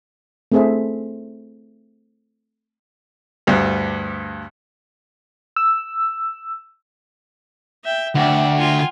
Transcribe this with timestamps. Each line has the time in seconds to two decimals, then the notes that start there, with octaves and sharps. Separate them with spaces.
0.52 A3 C4 G#4 A4 C5 E5
3.47 D2 G2
5.56 E6
7.84 E5 G5
8.16 D2 D5 E5 F#5 G5
8.58 F4 G#5